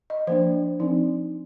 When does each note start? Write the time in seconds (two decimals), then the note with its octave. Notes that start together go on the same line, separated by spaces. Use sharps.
0.10 D#5
0.27 F3 A#3 D4 C5
0.80 F3 C4 D#4